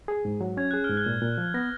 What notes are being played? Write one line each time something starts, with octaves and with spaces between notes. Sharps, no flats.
G#4
G#2
F#3
C#4 G#6
G#4 F#6
G#2 F6
F#6
A#2
A#2
F3
B3 A#6